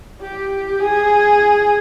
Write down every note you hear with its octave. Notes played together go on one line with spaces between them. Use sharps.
G4
G#4